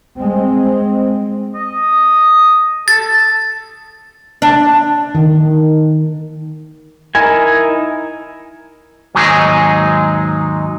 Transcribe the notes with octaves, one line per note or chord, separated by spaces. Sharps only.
G#3 C4
D#5
A4 A6
D4
D#3
D#4 E4 A#4 G#5
D#2 G#2 F#3 G#3 D#4 G#4